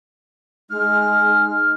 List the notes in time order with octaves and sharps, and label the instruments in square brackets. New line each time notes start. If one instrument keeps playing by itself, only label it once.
[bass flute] G#3 [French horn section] D#4 [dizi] F6